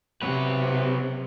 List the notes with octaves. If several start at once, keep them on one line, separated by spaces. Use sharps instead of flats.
C3 F#3 B4